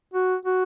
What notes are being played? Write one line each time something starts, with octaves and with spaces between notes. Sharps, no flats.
F#4
F#4